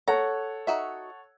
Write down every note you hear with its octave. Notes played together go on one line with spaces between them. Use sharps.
A4 C#5 F#5 A#5
D#4 F#4 E5